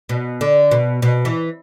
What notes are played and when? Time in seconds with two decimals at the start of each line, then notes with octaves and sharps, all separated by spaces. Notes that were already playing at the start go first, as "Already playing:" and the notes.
0.09 B2
0.41 D3
0.71 B2
1.02 B2
1.25 E3